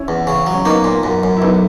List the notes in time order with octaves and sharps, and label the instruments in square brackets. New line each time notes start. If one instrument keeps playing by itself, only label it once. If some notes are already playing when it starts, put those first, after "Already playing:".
Already playing: [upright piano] C#4 E4
[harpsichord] E2
C#3
F#3
[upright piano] C#4
[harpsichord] A#3 [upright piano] B3 D#4
[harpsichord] A#2
F#2
F#2
[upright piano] E4
[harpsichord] B1 [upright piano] B3 D#4